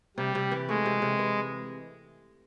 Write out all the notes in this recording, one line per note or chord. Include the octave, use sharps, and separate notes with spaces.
C3 G3
C3
E3
G#3 A3
C3
C3
E3